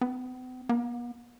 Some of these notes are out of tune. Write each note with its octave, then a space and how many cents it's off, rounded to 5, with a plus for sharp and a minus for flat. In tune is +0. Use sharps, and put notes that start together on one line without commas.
B3 +45
B3 -45